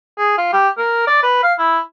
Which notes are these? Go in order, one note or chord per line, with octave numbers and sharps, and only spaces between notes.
G#4
F4
G4
A#4
D5
B4
F5
E4